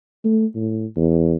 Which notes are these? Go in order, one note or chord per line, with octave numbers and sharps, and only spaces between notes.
A3
A2
E2